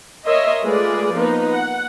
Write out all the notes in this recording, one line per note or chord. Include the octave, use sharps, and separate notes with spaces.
A#4 C#5 D#5 E5 C6
G#3 A3 F4 G#4 B4 D5
F3 A#3 B3 D#4 B4
F#5